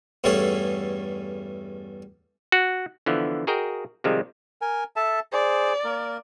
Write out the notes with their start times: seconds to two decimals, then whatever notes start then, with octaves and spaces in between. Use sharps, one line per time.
0.24 E2 G2 A3 C#4 G#4 A4
2.52 F#4
3.06 D3 E3 F3 B3
3.47 F#4 G#4 A#4 D#5 G5
4.04 C3 D#3 F3 G3 G#3
4.61 A#4 G#5
4.96 A4 E5 A5
5.32 G#4 C5 D5
5.85 A#3 A#4